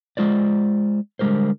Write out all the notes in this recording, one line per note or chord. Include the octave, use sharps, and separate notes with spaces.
G#3 F4 C5 D5
D3 G3 G#3 G4 A#4 C5